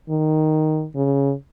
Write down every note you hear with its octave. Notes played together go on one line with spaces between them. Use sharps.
D#3
C#3